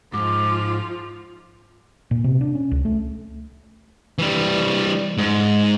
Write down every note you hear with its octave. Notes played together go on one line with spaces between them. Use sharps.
G#2 F3 F4 D6
A#2
C3
D4
C#4
C#2
A3
E3 G3
G#2